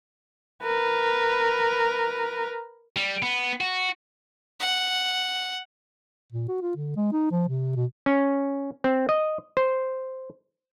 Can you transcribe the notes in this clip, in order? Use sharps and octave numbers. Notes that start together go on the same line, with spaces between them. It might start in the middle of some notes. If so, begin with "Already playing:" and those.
A#4 B4
G3
B3
F#4
F#5
A#2
F#4
F4
D3
G#3
D#4
F3
C3
B2
C#4
C4
D#5
C5